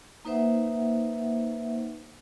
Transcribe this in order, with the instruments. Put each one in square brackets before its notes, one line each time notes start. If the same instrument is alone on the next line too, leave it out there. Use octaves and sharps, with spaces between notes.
[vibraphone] A#3 D#4 B4 C5 E5 F#5